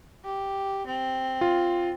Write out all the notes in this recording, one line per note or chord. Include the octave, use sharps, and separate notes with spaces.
G4
C4
F4